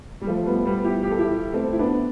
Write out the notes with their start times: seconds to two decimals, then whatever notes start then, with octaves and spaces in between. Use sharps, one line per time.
0.21 G3
0.27 F3 A3
0.46 G3 B3
0.65 G3 B3
0.84 E4 G4
1.03 G4
1.11 A4
1.19 E4 G4
1.54 A3 C4
1.73 E4
1.79 B3 D4